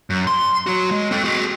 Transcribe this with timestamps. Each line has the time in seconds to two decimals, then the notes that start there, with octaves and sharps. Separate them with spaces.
0.10 F#2
0.27 C6
0.66 F#3 F#4
0.91 G#3
1.11 C4 A4
1.24 F#4 G#4